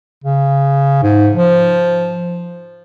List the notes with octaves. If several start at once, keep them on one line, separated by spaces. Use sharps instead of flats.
C#3
G#2
F3